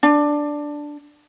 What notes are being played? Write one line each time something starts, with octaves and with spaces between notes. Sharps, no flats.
D4